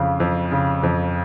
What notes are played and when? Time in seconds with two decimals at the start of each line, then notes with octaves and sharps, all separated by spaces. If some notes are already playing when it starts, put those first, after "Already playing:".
Already playing: F2 C#3 F5
0.20 F2
0.52 C#3
0.83 F2